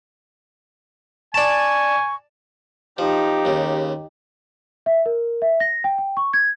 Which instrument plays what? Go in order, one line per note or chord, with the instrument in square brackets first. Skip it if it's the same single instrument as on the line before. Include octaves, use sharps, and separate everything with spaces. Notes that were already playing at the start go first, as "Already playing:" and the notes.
[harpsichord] D5 A5 [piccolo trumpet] G#5 [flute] C#6
[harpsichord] F3 [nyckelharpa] D#4 G4
[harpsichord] D#2 C#3
[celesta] E5
A#4
E5
A#6
G5
G5
C#6
G#6